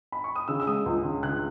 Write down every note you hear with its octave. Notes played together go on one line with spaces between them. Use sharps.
B5
C#6
D#6
C#3 E6
E6
G#3 D#6
C#2
C#3
C#3 F#6